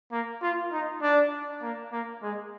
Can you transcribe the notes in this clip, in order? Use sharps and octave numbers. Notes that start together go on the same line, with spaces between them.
A#3
F4
D#4
D4
A#3
A#3
G#3